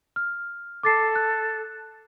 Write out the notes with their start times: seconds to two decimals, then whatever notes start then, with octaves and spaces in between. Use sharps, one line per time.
0.16 F6
0.83 A4 D6 A6 C7
1.15 F#6